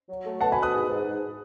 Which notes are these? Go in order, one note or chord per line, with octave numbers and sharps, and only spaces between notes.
F#3
A3
B2 F#5 A5
G#5 B5
B2
D#6 F#6
G#2
G#2
G#2